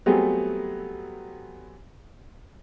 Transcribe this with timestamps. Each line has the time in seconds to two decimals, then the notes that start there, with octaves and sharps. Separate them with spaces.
0.06 F#3 G3 A3 B3 C4 G#4